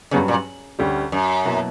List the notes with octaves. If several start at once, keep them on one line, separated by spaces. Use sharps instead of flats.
G2 C#3 F#3 C#4 G4 B4
A#2
D2 D3 G3 C#4 G4
F#2
B2 F#3 A#3 E4